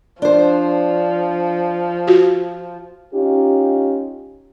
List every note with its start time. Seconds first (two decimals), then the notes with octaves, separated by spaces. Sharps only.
0.22 F3 D4 C5
2.07 F4 F#4
3.13 C#4 D#4 F4 G4